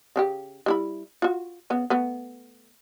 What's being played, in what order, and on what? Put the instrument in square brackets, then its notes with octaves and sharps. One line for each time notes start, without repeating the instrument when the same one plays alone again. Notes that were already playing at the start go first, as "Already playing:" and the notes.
[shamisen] C#3 D4 G4
G3 E4 B5
F4 F#4
C#3 B3
A3 B3